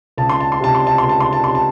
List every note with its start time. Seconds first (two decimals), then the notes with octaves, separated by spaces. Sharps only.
0.18 C#2 A5
0.29 C6
0.40 A5
0.52 C6
0.61 C3 A5
0.75 C6
0.87 A5
0.98 C6
1.03 C#2
1.09 A5
1.20 C6
1.33 A5
1.44 C3 C6
1.55 A5